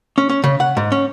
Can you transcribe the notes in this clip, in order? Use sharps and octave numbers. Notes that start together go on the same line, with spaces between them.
C#4
C#4
C#3
F#5
G#2
C#4